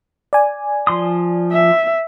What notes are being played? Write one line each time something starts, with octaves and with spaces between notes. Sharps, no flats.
D5 G#5
F3 C6 D#6
E5